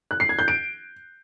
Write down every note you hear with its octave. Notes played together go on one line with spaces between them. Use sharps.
F#6
C7
G#6
G6
D7